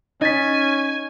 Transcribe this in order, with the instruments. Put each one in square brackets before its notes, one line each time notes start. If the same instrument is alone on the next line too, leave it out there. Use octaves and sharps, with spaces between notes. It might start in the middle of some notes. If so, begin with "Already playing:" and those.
[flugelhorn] C#4 [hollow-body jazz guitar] D#4 [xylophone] D#5 A6 B6 [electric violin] G#5